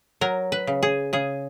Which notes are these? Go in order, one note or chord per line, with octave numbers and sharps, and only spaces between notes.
F#3 A#4
B4
C#3
G#4
C#3 G#4